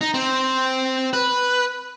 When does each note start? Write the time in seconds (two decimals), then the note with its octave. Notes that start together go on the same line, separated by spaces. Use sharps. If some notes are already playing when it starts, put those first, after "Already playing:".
0.01 D#4
0.14 C4
1.13 B4